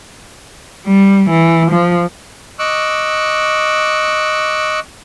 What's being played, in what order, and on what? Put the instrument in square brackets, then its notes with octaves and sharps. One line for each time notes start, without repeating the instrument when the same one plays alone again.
[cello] G3
E3
F3
[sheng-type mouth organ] D#5 C#6 D6 E6 F#6